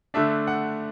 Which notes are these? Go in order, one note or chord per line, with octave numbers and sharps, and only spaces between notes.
D3 A3 D4 E5
F#5